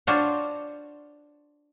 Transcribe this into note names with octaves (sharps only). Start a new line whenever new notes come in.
D4 F4 F#4 C5 C#5